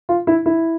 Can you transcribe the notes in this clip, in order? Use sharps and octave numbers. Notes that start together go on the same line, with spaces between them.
F4
E4
E4